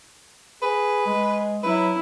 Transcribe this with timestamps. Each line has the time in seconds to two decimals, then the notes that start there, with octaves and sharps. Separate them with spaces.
0.62 G#4 B4
1.06 G#3
1.63 F#3 E4 B4